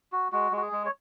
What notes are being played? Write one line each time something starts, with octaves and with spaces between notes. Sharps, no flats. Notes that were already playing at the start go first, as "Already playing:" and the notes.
F#4
G#3 F#4
G#3 F#4
G#4
G#3
C#5